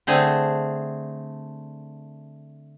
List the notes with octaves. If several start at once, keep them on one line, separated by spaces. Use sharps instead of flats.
D3 A3 C4 G#4